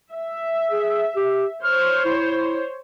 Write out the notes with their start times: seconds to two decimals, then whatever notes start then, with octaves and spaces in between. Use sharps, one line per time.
0.11 E5
0.71 G#4
1.16 G4
1.63 C5 C#5 F6
2.05 E4